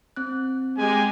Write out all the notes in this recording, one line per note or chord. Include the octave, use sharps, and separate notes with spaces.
C4 F#6
G#3 G4 G#5